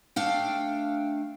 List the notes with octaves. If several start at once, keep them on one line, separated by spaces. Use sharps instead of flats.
A3 D4 F5 G5